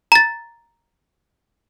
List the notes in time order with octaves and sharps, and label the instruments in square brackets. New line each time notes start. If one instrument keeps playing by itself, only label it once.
[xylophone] A#5 A6